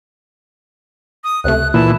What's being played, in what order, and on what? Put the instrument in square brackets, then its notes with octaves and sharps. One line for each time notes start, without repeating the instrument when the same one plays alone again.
[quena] D#6
[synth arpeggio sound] C#2 C3 A3 [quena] F#6
[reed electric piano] A#2 [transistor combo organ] E3 [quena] A5